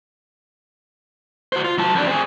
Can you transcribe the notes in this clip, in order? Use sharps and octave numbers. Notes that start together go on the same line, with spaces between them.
F#4 C5
F4
F#3 A5
F2 D4
C4 G#4